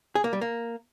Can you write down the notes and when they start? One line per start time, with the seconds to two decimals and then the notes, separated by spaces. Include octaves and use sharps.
0.15 G#4
0.24 A#3
0.33 G3
0.41 A#3